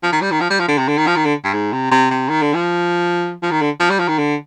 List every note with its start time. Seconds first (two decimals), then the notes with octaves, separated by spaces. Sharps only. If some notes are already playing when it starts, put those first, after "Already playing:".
0.03 F3
0.12 D#3
0.22 G3
0.32 D#3
0.41 F3
0.50 G3
0.60 F3
0.69 D3
0.78 C3
0.88 D3
0.98 D#3
1.07 F3
1.16 D#3
1.25 D3
1.44 G2
1.54 G#2
1.73 C3
1.91 C3
2.11 C3
2.29 D#3
2.42 D3
2.54 F3
3.42 F3
3.52 D#3
3.62 D3
3.80 F3
3.90 G3
3.99 F3
4.08 D#3
4.18 D3